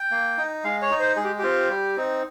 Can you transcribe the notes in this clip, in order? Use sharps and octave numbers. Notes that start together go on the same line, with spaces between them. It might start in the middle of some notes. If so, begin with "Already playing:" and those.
Already playing: G5
A#3
D#4
G#3 F5
C#5
D#4
C5
G#3 G#4
G4
C4 F4 G4
G3
C4 D#4